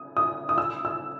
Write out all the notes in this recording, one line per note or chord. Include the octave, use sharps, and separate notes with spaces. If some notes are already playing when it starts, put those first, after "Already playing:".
Already playing: D#6
D#6
D#6
E6
E6